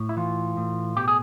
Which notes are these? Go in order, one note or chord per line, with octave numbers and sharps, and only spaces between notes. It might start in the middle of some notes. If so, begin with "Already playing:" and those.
Already playing: A2
E4
E3 F4
A2
B2 G4
G#4